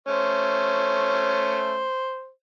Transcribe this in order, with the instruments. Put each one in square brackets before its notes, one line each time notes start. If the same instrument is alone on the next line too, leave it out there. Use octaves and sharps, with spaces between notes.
[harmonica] A3 C#4 [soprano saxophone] C5